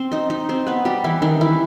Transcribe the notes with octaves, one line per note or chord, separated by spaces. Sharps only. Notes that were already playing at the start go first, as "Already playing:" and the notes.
Already playing: C4 C5
D#4 D#5
D#4 D#5
C4 C5
B3 B4
G3 G4
E3 E4
D#3 D#4
E3 E4